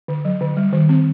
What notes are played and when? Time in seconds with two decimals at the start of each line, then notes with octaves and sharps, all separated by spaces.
0.08 D3
0.25 F#3
0.41 D3
0.57 G3
0.73 D#3
0.89 C4